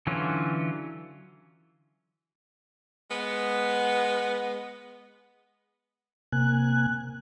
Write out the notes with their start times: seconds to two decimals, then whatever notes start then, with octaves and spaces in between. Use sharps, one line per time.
0.07 D3 E3 F#3 C#4 F4
3.11 G#3 B3
6.32 C3 A#3 G#5 F#6